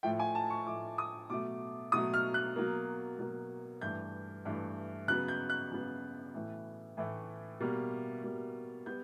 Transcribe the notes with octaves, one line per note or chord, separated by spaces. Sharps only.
A2 F3 A3 G5
G#5
A5
C#6
A2 F3 A3 D6
D#6
B2 F#3 A3 D6
B2 F#3 A3 D#6
F6
F#6
B2 F#3 A#3
B2 F#3 A#3
G2 E3 A3 G6
G2 E3 A3
C#3 F#3 B3 F#6
G6
F#6
C#3 F#3 B3
A2 E3 A3
A2 E3 A3
B2 G3 A#3
B2 G3 A#3
G3 B3 G6